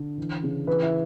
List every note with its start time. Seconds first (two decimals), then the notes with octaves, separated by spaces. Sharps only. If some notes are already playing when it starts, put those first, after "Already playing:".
Already playing: D3
0.18 E3
0.43 C#3
0.67 E3 B4
0.82 E4